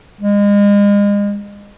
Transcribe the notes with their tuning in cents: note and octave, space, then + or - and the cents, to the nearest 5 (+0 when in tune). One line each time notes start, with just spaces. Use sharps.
G#3 -35